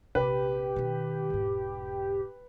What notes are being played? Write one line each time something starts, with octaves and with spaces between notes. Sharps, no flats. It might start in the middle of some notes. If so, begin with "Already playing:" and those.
A#1 C3 G4 B4
B2 D#3
E1 G#2